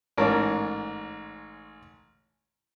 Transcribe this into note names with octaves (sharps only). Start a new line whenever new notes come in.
A1 G#2 C#4 A#4 A5